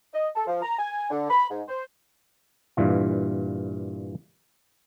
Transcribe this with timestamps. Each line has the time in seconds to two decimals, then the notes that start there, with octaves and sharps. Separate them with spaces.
0.14 D#5
0.34 A4
0.47 F3
0.62 A#5
0.78 G#5
1.11 D3
1.30 B5
1.49 G#2
1.68 C5
2.77 G2 A#2 E3 F4